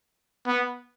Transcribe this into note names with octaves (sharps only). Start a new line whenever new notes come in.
B3